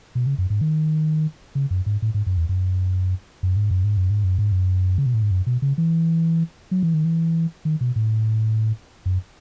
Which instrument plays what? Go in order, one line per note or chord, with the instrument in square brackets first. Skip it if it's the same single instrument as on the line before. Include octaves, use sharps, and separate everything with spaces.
[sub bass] B2
C#3
F#2
G#2
D#3
C#3
F#2
G#2
A2
G#2
F#2
E2
F#2
F#2
G#2
F#2
G#2
F#2
G#2
F#2
G#2
F#2
C#3
B2
A2
G#2
F#2
B2
C#3
E3
F#3
E3
D#3
E3
D#3
B2
A2
F#2